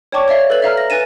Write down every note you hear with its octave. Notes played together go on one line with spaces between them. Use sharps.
C#5 D5 G5 A5 C#6 D6
C#5 D5 E5 F5
A4 B4 C#5 A6 F#7
E5 F5 A#5 F6
A#6
B4 G#5 A6 D#7 E7